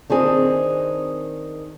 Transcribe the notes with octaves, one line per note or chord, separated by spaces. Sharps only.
D#3 C4 D4 G#4